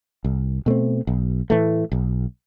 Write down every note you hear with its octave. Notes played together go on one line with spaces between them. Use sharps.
C2
B2 A3 C4
B1
A2 E3 A3
B1